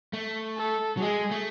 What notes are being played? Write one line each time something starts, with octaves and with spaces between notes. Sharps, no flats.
A3
A4
F#3
G#3 G#4
A3